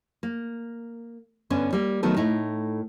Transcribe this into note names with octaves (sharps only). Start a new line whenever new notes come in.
A#3
G2 D3 B3 C#4
G3 A#3
D#3 F#3 A3 B3 A4
A2 A3 D#4